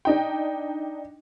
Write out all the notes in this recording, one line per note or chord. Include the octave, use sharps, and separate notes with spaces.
D4 D#4 G5